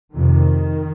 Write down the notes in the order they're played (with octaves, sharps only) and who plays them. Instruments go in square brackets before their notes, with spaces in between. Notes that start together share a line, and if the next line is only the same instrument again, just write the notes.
[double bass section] F2 C3 D#3